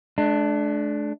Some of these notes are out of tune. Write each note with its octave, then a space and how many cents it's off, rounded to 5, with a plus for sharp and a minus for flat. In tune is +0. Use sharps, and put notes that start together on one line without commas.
A3 -45 D4 +0